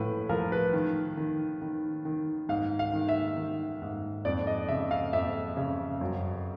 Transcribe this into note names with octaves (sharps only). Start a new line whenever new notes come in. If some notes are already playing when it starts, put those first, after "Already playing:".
Already playing: A2 F3 B4
F3 A#4
B4
D#3
D#3
D#3
D#3
G#2 F5
F5
D#3
E5
D#3
G#2
F2 D5
D#5
C#3 E5
F5
F2 E5
C#3
F#2